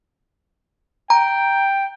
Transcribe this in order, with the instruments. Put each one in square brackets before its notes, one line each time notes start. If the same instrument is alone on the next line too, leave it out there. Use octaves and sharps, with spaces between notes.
[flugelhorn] G5 [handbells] A#5